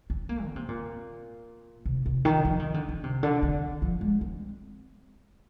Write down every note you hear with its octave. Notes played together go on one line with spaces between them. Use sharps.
C4
A#3
D3
C3
A#2
C3
C3
D#3
F3
D#3
D3
D3
C3
D3
D3
F3
G#3
C4